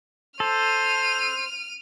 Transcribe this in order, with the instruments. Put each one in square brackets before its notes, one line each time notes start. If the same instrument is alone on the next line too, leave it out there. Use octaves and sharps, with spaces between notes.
[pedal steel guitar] A4 [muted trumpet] C5 [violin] F6 D#7